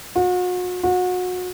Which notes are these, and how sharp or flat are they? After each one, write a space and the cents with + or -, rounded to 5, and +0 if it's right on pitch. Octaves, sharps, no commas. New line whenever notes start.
F#4 -40
F#4 -30